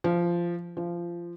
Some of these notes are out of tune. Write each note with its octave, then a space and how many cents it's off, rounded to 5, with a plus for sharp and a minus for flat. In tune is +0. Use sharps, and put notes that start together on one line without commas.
F3 -15
F3 -20